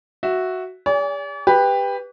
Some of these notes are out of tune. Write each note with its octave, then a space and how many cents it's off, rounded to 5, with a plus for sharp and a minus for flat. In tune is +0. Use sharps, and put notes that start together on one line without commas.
F#4 +0 E5 +0
G#4 -40 D5 -45 G#5 -15
G4 +20 B4 +0